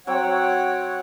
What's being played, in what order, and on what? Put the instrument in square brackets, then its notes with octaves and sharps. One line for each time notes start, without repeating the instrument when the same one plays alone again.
[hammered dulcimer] F#3 C4 F#4 [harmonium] C#5 F#5 [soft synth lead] G5